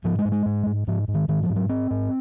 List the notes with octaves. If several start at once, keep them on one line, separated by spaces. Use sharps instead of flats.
G#2 F3
G#3
G#2
G#3
G#2
G#2
G#2 F3
G#2
D#3
G#2 D#3
F3
G#2
F#3
G#2 C4
G#2